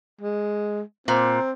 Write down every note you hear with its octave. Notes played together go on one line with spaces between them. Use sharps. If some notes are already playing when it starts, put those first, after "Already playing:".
G#3
A#2 C4